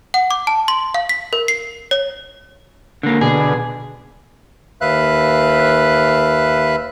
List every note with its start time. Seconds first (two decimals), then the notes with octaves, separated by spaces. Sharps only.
0.14 F#5
0.31 D6
0.47 A5
0.68 C6
0.94 F5
1.09 B6
1.33 A#4
1.48 C7
1.91 C#5
3.03 D3 A#3
3.21 B2 D3 G#4
4.81 D#2 B4 E5 F5 F#6